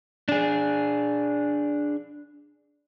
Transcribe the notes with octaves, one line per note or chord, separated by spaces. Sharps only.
D4 G#4